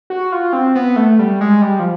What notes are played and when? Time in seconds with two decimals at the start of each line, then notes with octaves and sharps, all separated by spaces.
0.10 F#4
0.32 F4
0.53 C4
0.75 B3
0.96 A3
1.19 G3
1.41 G#3
1.62 G3
1.79 F3